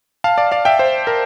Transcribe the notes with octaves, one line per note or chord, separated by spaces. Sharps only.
F5 A5
D5 F5
D5 F5
E5 G5
C5
A#4